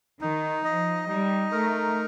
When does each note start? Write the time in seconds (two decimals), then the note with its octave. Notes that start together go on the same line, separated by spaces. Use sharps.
0.21 D#3 D#4
0.65 F3 D#5
1.08 G3 D#4
1.52 A3 A#4